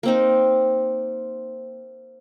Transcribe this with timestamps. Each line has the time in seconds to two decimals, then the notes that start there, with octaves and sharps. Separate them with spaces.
0.03 A#3 C4 D#4